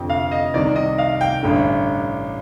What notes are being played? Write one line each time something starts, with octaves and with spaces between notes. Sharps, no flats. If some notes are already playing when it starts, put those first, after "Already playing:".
Already playing: F1 F2 D3 G5
F5
D#5
C2 C3 D#3 D5
D#5
F5
G5
A1 G2 D3